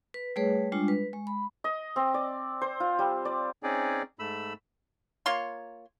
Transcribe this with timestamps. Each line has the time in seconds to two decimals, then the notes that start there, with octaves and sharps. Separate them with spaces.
0.14 B4
0.36 G3 A3 G#4 B4 C#5
0.72 G3 G#3 D4 F4
0.88 B4
1.13 G#3
1.27 B5
1.64 D#5
1.96 C4
2.14 D5
2.61 C5
2.80 F4
2.99 G3
3.25 D5
3.63 C4 C#4 D#4 G#4 D5
4.19 G#2 A3 B5 E6
5.26 A#3 F4 C#5 C6